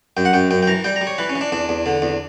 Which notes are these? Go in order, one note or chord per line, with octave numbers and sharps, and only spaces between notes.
F#2 G5
F#5
F#2 G5
F#2 G5
G5
E3 A#5
G3 G5
A#5
G3
C#5
E3 B4
C#4
E3
D4
E2 D4
E2
D3
E2